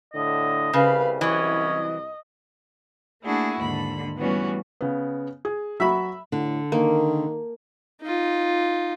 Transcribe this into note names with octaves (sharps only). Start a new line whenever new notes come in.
A2 D3 D#5
C2 C#3 B4 F5
E3 F#3 C#4 D#5
A3 A#3 D4 E4 F#4 G#4
D#2 G#2 D3 B5
E3 G3 A3 B3 C#4 F#4
C#3 B3
G#4
F#3 F#4 E5 B5
A2 D3
D#3 A#3
D#4 F4